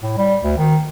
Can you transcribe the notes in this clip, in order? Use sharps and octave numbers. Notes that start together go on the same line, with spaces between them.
A2
G3
D2
D#3